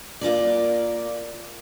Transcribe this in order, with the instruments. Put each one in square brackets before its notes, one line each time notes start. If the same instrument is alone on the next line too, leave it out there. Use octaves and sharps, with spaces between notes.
[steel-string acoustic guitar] A#3 F4 A#4 D5